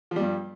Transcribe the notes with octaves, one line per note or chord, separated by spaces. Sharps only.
G2 F3 G3